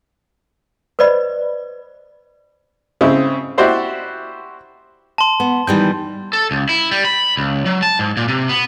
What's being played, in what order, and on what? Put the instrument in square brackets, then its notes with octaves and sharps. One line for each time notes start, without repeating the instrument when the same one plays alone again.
[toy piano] B4 C5 D5 D#5 B5
[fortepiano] C#3 C4 E4
E4 F#4 G4 C5 D5
[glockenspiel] A5 C6
[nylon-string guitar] B3
[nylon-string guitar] D#3 E3 G3 [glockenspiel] G6
[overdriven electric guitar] A4
C#2
E4
G3
B5
C#2
F#3
A5
G#2
A#2
C3
B3